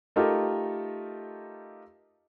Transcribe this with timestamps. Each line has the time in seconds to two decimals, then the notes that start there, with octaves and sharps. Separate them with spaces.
0.16 A3 D#4 F4 G4 A4 A#4